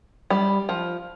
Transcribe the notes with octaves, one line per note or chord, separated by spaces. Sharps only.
G3
F3